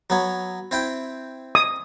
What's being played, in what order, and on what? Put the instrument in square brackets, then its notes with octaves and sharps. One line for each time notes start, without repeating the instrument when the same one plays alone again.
[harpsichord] F#3 B3 C#5
C4 E4 G5
[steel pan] D#6